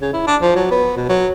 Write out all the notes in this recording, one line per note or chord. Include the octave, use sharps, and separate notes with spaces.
C#3
E4
D4
F3
F#3
B3
B2
F#3